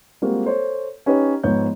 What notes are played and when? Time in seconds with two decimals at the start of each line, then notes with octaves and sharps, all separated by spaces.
0.22 G3 G#3 A#3 C4 F4 F#4
0.45 A4 C5 C#5
1.06 C#4 D#4 G4 B4 C#5
1.44 G#2 F3 B3 C#5 G6